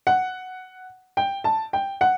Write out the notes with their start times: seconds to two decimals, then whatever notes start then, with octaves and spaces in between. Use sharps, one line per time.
0.07 F#5
1.17 G5
1.44 A5
1.73 G5
2.01 F#5